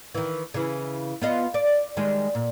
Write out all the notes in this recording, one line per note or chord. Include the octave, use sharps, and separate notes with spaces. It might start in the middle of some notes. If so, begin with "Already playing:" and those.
D#3 E3
C#3 E3
B3 F4 D#5
D5
D#3 G3 G#3
A#2